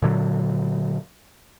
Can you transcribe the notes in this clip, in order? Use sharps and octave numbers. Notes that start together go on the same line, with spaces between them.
A#2 D3 F#3